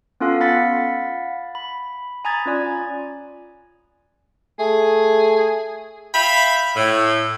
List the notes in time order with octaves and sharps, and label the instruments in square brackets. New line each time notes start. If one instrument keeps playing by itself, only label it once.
[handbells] B3 C#4 F4 A4 F5
F5 F#5 B5 A6 B6
B5
G#5 A#5 B5 D#6 G#6 A6
C#4 F4 D5 G#5
[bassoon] A3 [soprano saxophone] G#4
[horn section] E5 F5 G5 B5
A2